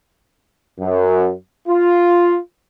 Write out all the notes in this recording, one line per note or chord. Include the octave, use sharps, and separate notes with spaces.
F#2
F4